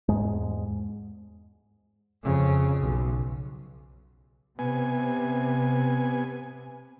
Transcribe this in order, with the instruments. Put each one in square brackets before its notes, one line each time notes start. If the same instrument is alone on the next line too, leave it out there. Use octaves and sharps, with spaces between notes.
[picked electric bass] E2 G#2 G#3
[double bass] F2 C#3
B1
[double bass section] C3 [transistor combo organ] B3 G#5